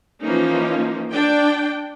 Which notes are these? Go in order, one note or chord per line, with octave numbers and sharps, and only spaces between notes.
E3 F3 A#3 C#4 D#4
D4 G5